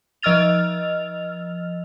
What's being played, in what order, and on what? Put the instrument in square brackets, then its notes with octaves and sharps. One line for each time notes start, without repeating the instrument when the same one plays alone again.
[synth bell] F3 D#5 E6 F6 A6 F7